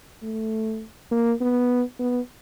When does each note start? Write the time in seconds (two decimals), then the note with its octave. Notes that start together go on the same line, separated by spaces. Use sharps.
0.23 A3
1.12 A#3
1.41 B3
1.99 B3